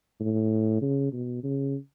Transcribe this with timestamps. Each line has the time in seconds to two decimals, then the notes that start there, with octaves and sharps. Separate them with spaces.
0.20 A2
0.82 C#3
1.13 B2
1.43 C#3